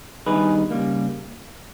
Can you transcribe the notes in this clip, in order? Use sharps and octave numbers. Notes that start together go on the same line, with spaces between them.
G2 D#3 G3 B3 D#4 G#4 B4
C#3 G3 A#3